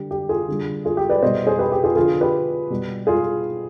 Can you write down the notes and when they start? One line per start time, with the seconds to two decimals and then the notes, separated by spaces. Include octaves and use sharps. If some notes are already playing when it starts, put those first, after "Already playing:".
Already playing: D3 G3 G4
0.11 G4
0.29 F4 G#4
0.48 D3 G3
0.85 F4 G#4
0.97 G4
1.09 B4 D5
1.22 B2 G3 C5 D#5
1.47 G#4 C5
1.59 G4 B4
1.72 G4
1.84 F4 G#4
1.96 D3 F3 F4 G#4
2.21 G4 B4
2.70 B2 G3
3.07 F4 G#4